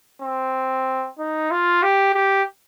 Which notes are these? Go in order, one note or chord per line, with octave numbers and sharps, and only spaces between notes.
C4
D#4
F4
G4
G4